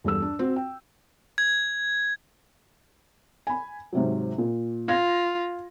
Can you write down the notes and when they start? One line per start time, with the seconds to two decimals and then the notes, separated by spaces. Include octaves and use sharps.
0.04 E2 G2 A4 E6
0.22 D4
0.39 C4 F#4
0.56 G5
1.38 G#6
3.47 G#5 B5
3.93 G#2 C3 F#3
4.38 A#2
4.88 F4 F5 G#6 A#6